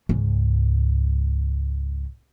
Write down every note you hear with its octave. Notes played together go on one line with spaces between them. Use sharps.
C#2 G#2